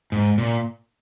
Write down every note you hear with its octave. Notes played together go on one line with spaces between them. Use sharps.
G#2
A#2